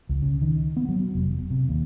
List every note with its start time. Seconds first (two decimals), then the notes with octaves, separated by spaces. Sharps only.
0.09 C#2
0.22 C#3
0.42 D#3
0.77 B3
0.89 F#3
1.15 F1
1.50 C3
1.69 D#2